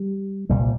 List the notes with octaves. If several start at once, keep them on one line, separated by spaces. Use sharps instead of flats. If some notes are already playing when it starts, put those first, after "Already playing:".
Already playing: G3
C2 A#2 G3